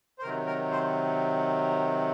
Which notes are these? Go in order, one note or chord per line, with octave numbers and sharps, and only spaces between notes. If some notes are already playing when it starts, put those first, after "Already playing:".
C5
C3 D#3 F#3 A#4
A#4
C5